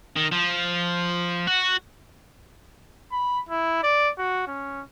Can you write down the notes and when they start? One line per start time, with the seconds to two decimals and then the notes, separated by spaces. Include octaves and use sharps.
0.16 D#3
0.32 F3
1.47 F#4
3.11 B5
3.49 E4
3.83 D5
4.18 F#4
4.47 C#4